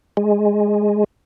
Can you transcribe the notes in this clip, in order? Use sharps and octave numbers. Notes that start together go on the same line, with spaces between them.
G#3